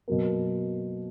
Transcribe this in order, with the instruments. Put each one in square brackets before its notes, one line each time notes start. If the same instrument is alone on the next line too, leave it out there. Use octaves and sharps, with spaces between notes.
[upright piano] B2 F#3 A#3